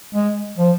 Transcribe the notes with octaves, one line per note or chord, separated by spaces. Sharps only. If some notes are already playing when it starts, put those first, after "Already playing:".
G#3
F3